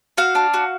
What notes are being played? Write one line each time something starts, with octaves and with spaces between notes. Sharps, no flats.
F#4 F5
D4
F#4